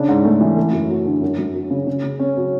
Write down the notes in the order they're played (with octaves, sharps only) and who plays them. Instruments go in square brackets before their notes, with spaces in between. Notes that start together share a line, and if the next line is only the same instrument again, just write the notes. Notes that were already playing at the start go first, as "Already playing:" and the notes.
Already playing: [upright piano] C#3 D4
G#2
A3
E3
A3
F#2
F#3
D3
F#2
F#2
F#3
C#3
C#3
C#3
C#4
F#3